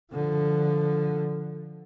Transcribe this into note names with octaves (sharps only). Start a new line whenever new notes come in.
D3 F3